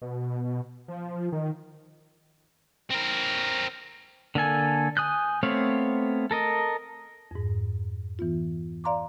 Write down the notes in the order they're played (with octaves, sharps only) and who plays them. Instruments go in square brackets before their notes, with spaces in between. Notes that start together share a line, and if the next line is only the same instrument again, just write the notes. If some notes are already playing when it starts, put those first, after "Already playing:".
[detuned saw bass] B2
F3
D#3
[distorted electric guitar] C4 A#4
[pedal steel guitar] D3 A#3 A4 G#5
G#5 D#6 F#6 G6
A3 B3 C4 C#5 F5
A4 A#4 D#5
[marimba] F2 G#2
E3 B3 F4
D5 F5 A#5 C6 D6